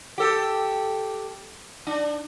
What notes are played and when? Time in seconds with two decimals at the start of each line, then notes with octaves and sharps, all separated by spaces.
0.18 G4 A4
1.87 D4